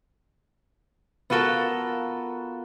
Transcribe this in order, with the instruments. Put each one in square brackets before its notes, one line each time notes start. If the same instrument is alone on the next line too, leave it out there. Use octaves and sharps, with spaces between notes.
[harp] B3 F4 F#4 A4 A#4